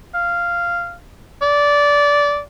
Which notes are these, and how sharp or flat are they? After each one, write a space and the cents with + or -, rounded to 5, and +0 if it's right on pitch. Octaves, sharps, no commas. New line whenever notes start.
F5 -10
D5 -15